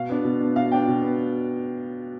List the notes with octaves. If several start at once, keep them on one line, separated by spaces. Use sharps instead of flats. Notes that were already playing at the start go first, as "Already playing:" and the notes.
Already playing: B2 F5
B3 D4
B2
B3 D4
B2 F5
B3 D4 G5
B2
B3